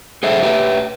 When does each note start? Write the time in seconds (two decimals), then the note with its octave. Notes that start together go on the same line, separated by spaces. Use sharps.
0.23 G#4 A4 C5 E5
0.43 G4 B4 E5